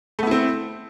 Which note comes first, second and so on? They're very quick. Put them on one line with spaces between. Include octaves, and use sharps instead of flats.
A3 B3 E4 C4